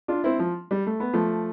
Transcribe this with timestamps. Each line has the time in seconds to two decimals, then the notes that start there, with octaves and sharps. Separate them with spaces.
0.08 D4 F4
0.24 C4 E4
0.39 F3
0.71 G3
0.87 A3
1.00 B3
1.13 F3 A3